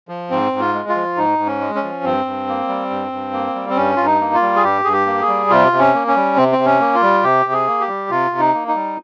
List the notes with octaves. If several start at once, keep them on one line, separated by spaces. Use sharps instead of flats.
F3
G#2 C4
G#2
F4
G#3
F4
F3
G#2 D#4
G#2
C#4
G#3
C#4
F3
G2 C4
G2
A#3
G3
G2
G2
A#3
G3
C4
G2 C#4
G2 F4
D#4
A#3
F4
G3
G#4
G2 G4
G2 G#4
G4
A#3
G#4
G3
C3 F4
C3
C#4
A#3
C#4
G3
C3 C4
C4
C3
C#4
A#3
F4
G3
C3 G4
C3
G#4
A#3
G4
G3
C3 F4
C3
D#4
A#3
D#4
G3